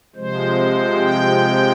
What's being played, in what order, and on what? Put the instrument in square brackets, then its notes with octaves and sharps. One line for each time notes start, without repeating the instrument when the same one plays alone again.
[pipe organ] C3 F3 G#3 C5
G5